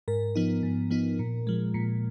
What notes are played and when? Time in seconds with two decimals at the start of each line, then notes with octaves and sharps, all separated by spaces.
0.08 G#2 A#4
0.36 F3 B3 D#4
0.63 G#2
0.91 F3 B3 D#4
1.19 A#2
1.47 F3 G#3
1.74 A#2